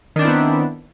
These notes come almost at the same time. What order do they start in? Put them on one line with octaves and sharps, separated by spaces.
D#3 D4 C4 E4 B3